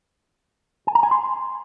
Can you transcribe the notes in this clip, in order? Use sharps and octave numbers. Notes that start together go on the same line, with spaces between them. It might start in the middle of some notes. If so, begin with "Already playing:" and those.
G#5
A#5
G#5
C6